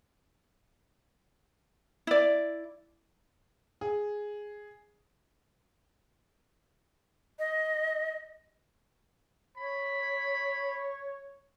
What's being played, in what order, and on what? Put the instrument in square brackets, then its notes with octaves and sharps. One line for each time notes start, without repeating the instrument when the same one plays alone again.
[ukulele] E4 D5
[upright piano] G#4
[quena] D#5
[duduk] C#5 [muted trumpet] B5